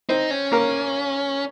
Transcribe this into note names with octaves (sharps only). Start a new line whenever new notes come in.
C4 D#4 C5
C#4
A#3 A#4